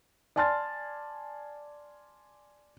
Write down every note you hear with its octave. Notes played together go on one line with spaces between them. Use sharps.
D5 G#5 A5 C6 F6 A6